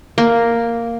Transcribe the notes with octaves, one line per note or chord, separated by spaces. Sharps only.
A#3